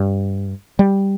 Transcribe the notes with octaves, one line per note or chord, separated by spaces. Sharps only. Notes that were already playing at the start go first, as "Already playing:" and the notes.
Already playing: G2
G3